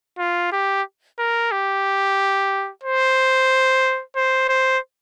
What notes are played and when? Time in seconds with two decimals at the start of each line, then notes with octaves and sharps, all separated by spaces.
0.19 F4
0.53 G4
1.19 A#4
1.52 G4
2.84 C5
4.16 C5
4.49 C5